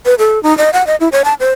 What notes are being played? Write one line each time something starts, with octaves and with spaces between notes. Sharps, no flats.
B4
A4
D#4
D#5
F#5
D#5
E4
C#5
A5
C5